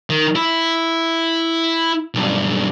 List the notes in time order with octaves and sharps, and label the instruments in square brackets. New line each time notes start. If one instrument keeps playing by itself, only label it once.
[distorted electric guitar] D#3
E4
B1 G2